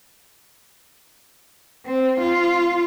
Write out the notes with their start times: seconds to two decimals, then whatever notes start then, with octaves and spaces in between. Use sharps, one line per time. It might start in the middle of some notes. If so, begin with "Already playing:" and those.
1.86 C4
2.21 F4